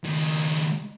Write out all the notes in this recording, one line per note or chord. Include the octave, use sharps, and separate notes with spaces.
C#2 D#3